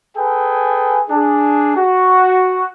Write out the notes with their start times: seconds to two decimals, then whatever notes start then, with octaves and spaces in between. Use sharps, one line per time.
0.17 G#4 A4 B4 G5 G#5
1.09 D4 G#4
1.77 F#4